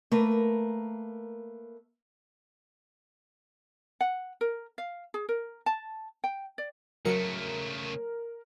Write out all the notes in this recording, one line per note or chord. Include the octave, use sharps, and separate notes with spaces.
A3 A#3 A#4 B4
F#5
A#4
F5
G#4
A#4
A5
G5
D5
C#3 F#3 A3 A#4 C#7